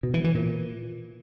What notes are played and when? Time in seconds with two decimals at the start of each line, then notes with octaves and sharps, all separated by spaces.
0.03 B2
0.14 E3
0.24 E3
0.35 A#2